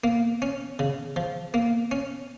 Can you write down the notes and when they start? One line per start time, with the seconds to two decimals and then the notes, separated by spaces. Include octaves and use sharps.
0.04 A#3
0.42 C#4
0.79 C#3
1.16 F3
1.54 A#3
1.91 C#4